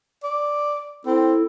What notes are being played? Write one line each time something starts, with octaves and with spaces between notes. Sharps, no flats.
D5
C4 E4 A4